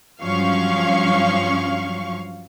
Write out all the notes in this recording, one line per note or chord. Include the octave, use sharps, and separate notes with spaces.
G2 F3 F#3 C#4 F5 C#6